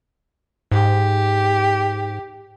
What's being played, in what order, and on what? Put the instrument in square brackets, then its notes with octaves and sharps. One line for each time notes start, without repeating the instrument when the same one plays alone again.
[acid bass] G#2 [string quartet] G4